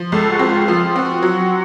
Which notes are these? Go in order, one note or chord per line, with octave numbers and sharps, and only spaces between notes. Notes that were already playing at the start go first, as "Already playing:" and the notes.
Already playing: F3
C#2 A4
F#4
C4
F4
F3 F4
C4 F#4
F#3